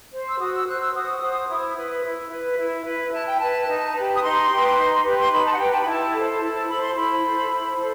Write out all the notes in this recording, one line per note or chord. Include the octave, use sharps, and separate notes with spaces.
C5
E6
F#4 D#6
E6
C5 F#6
E6
F#4 D#6
C5
E4
B4
E4
B4
E4
B4
E4 A5
G5
B4 A5
D#4
G4 B4
D#6
D#4 C6
G4 B4
D#4
G4 B4
C6
D#4 B5
A5
F#5
G4 B4 G5
A5
B5
E4 A5
A4 C5
E4 A5
A5
A4 C5 B5
C6
E4 B5
C5
A4
E4
A4 C5